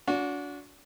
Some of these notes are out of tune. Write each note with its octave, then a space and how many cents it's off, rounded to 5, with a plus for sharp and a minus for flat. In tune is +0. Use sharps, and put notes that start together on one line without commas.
D4 -35 F#4 -25